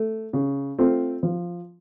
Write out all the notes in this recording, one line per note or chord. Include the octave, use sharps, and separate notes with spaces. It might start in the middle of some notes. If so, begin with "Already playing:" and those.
Already playing: A3
C#3
A3 C4 F4
F3